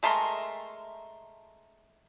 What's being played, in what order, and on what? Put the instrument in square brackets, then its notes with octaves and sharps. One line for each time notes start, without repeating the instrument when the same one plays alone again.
[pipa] G#3 A3 A#4 C6